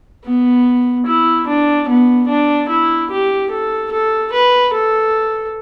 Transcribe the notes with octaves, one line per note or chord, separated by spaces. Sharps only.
B3
E4
D4
B3
D4
E4
G4
A4
A4
B4
A4